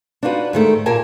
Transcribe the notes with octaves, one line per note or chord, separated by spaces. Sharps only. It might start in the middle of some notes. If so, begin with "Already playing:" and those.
D4 D#4 F4 F#4 B4
G#2 D#3 A3
A#2 G4 A#4 G#5 A5